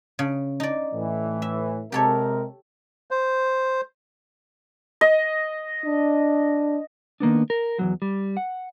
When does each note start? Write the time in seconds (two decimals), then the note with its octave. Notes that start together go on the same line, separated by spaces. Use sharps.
0.19 C#3
0.60 D#4 D5
0.94 A2 E3
1.42 E5
1.92 C3 G#3 G4 A4 A#4 C#5
3.11 C5
5.01 D#5
5.86 D4
7.20 D#3 A#3 B3 D4
7.50 A#4
7.79 E2 G#2 F#3
8.02 G3
8.37 F#5